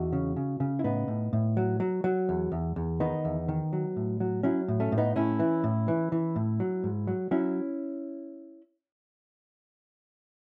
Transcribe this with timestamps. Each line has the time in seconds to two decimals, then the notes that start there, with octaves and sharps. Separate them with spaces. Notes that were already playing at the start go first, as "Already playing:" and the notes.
Already playing: E2 D#4 F#4
0.13 C#3
0.36 C#3
0.60 C#3
0.79 E4
0.84 A2 B3 D#4
1.08 A2
1.33 A2
1.57 F#3
1.80 F#3
2.04 F#3
2.29 E2
2.52 E2
2.76 E2
3.00 D#3 B3 D#4
3.25 E2
3.48 D#3
3.73 F#3
3.96 A2
4.20 F#3
4.43 F#3 C#4 E4
4.68 A2
4.80 A3 C#4
4.92 A2
4.97 B3 D#4
5.16 A2 C#4 E4
5.39 E3
5.64 A2
5.88 E3
6.12 E3
6.36 A2
6.60 F#3
6.84 G#2
7.07 F#3
7.31 F#3 C#4 E4